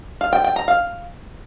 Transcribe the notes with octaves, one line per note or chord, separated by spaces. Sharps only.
F5
G5
G5
A#5
F5